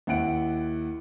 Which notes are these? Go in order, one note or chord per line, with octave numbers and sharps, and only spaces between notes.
D#2 E4 F#5 D7